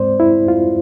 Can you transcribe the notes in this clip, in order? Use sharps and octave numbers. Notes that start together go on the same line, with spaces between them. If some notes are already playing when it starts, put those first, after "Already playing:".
Already playing: G#2 G#3 C4 C5 D5
E4
F4